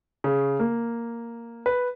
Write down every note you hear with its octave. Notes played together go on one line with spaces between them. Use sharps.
C#3
A#3
B4